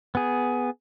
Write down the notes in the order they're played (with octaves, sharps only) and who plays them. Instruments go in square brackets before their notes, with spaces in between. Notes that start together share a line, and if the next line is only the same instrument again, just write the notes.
[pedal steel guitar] B3 G#4